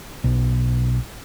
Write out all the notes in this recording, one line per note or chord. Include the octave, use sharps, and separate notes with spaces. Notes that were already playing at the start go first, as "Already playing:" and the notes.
B1